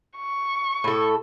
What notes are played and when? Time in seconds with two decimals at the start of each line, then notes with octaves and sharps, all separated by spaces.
0.18 C#6
0.84 A2 A4